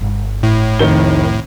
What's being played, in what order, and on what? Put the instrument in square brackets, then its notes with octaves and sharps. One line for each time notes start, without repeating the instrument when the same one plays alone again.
[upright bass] G1
[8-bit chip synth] A2
[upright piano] F1 D#3 G7 [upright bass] C2